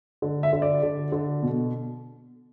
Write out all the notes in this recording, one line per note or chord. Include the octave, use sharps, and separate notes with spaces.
D3
E5
D3
D5
D3
D3
B2